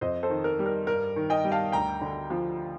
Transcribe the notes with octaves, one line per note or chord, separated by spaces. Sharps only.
F2 C5 D#5
A4 C5
D#3
A#4
G3
A#4
G2 A#4
D#3
D#5 G5
G3
F5 A5
D2 G5 A#5
D3
F3